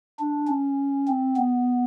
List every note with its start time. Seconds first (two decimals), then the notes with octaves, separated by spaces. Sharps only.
0.20 D4
0.48 C#4
1.08 C4
1.37 B3